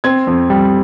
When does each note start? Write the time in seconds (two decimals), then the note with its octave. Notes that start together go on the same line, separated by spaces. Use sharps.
0.04 C4 G#6
0.27 F2
0.50 G3